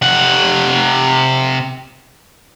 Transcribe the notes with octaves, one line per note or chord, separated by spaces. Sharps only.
C3 F#5